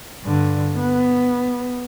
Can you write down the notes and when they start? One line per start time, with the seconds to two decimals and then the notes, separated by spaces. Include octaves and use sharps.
0.22 G2 D3
0.76 B3